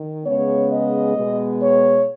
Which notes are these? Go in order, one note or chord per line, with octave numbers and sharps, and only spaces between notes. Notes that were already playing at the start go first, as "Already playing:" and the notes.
Already playing: D#3
C#3 G#3 B3 C#5
D#5
B2 G#3 B3
C#5